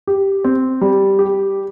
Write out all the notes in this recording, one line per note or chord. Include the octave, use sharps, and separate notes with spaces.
G4
C4
G3
G4